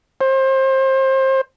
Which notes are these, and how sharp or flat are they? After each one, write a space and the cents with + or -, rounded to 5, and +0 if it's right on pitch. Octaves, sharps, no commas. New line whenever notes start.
C5 +30